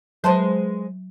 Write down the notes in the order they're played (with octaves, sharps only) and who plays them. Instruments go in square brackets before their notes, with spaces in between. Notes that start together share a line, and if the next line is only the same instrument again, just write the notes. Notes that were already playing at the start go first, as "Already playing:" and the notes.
[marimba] F#3 A5 C6 [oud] G#3 B4 C5